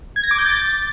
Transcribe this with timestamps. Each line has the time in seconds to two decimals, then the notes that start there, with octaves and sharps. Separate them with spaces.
0.16 G#6
0.23 A#6
0.31 D6
0.38 G6
0.46 A6